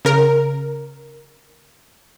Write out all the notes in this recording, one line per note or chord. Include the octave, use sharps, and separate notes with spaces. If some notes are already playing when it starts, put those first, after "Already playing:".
C#3 A#4